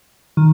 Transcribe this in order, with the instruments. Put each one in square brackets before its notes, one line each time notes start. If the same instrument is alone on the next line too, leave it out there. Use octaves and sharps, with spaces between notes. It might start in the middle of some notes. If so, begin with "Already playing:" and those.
[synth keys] D#3